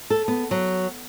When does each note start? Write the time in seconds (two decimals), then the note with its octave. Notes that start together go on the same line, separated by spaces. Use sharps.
0.10 A4
0.28 B3
0.51 F#3